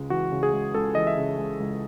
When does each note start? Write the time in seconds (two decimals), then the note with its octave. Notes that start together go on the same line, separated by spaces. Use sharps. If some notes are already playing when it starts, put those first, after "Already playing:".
Already playing: C#2 C#3 G#3
0.10 E3 F#4
0.32 C#3
0.43 G#4
0.53 G#3
0.75 C#2 A4
0.95 E3 D#5
1.07 E5
1.18 C#3
1.38 G#3
1.60 C#2